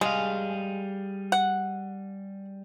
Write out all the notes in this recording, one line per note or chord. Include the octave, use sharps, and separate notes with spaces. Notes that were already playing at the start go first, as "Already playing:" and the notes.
G3 G#3 G#4 F5
F#5